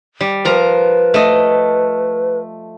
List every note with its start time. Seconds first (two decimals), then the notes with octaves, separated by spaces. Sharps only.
0.21 G3
0.45 F3 A#4 B4 A#5
1.14 A3 D#5